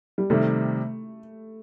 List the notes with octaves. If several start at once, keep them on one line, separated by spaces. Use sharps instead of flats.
G3
C3 D#3 G3 A3